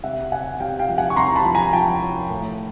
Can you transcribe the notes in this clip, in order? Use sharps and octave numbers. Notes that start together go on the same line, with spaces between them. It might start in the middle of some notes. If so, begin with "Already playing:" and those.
C3 E5 F#5
C3 F#5 G#5
C3 F5 G5
F5 G5
F3
F#5 G#5
C#6
C3 A#5 C6
A5 B5
F3
G#5 A#5
F3 G5 A5
F3
A2